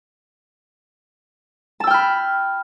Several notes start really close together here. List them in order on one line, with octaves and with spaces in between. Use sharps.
A5 E6 G5 F6 B5